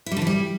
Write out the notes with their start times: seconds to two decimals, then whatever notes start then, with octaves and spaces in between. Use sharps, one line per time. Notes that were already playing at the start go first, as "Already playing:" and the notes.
0.06 E4
0.12 G3
0.17 D3
0.22 E3
0.27 G3